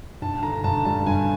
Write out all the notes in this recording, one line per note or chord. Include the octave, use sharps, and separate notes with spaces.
G2 A5
D3 A#5
G2 A5
G3 A5
G2 G#5